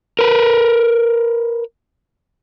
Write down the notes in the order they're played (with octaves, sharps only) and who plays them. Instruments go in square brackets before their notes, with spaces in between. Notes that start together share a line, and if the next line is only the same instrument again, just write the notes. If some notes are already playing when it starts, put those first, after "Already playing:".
[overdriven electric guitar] A#4 B4